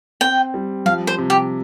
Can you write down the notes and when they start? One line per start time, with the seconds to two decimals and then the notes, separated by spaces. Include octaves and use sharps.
0.21 C4 G5
0.54 G3
0.86 F3 F5
1.07 C5
1.18 C3
1.30 G4